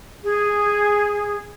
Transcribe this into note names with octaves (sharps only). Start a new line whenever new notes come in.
G#4